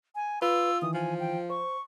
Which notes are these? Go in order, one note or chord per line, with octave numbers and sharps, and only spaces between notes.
G#5
F4 B4 E6
D#3 E3 D#6
F3 G#5
G5
C5 C#6